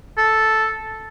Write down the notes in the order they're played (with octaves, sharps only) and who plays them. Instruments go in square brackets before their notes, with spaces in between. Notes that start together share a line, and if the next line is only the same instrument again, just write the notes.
[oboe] A4